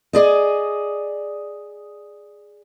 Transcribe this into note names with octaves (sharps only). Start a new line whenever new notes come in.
G#4 D5 D#5